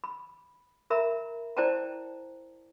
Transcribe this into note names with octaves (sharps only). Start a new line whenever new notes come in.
B5
A#4 E5 A#5 B5
E4 C5 D5 G5 A5 A#5